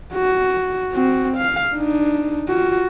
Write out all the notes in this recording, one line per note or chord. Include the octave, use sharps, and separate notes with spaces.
F#4
C4 F#4
F5
D4 D#4
F4 F#4